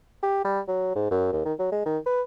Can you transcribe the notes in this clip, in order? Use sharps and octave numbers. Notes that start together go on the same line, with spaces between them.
G4
G3
F#3
G#2
F#2
D#2
D#3
F#3
G#3
D#3
B4